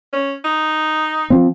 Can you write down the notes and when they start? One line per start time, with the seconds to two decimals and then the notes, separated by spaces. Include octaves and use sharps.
0.13 C#4
0.45 D#4
1.30 F3 C4